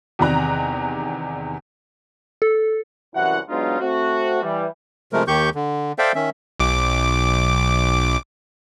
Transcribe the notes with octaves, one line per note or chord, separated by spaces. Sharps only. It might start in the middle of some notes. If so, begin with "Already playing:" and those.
E2 C3 D#3 D5 A#5 F#6
A4
C2 F#2 E3 E4 F#4 F#5
F#3 G#3 B3 D4 D#4 F4
A3 C4 F#4
E3 G3
C3 F3 G#3 A3 A#4
D#2 D#3 G4 C#6 G6
D3
A4 C5 D5 E5 F5 G5
D#3 C#4 E5
B1 D6